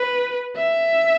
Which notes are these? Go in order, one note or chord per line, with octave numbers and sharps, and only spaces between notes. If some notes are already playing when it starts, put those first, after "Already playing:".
Already playing: B4
E5